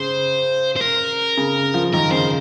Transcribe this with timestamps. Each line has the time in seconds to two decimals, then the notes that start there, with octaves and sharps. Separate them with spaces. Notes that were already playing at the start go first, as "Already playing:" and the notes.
Already playing: C#3 C5
0.77 C5
0.81 A#4
1.37 C#3
1.74 F3
1.93 D#3 A#4
2.12 C#3 C5